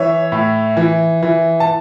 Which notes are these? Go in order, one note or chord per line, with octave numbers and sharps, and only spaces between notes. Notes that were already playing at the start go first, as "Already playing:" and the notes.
Already playing: E3 C#5 E5
A2
E3
E3
A5